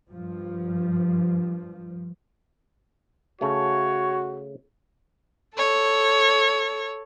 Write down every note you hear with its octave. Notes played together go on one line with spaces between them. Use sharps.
G2 F3
C#3 A3 F#4 C#5
A4 C#5